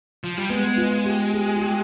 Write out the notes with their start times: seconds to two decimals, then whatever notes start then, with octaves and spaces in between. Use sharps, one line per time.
0.24 F3
0.38 G3
0.49 G#3 B3
0.78 F4
1.06 G4
1.34 G#4
1.56 F4
1.62 G4